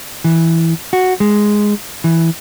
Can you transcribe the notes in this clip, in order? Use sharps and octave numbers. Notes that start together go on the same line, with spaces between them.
E3
F#4
G#3
E3